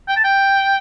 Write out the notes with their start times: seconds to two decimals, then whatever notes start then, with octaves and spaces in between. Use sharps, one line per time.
0.08 G5
0.16 A5
0.24 G5